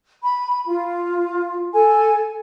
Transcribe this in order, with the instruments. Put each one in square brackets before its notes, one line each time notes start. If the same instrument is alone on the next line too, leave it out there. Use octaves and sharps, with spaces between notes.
[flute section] B5
F4
A4 G#5